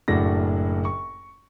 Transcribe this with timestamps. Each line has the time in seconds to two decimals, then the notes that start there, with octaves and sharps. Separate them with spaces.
0.08 F#1 A2 D4 F#4 A#6
0.85 C#6